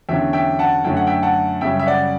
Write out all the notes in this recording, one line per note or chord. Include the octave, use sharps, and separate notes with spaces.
E2 D3 F#3 C#4 E5 G5
E5 G5
F#5 A5
F#2 D3 F#3 A3 C#4 G5
F#5
E5 G5
F#5 A5
F#2 C#3 G3 C#4 E5 G5
E5
D5 F#5